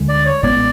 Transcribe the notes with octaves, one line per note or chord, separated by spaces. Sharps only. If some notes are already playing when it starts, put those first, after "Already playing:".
Already playing: D2 D3 G#3
D5
C#5
A1 A2 G#3 B3 D5